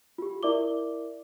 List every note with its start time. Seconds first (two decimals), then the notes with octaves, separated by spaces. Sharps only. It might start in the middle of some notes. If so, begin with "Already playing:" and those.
0.18 F4 G4
0.43 E4 A#4 D5 E5 D6 G7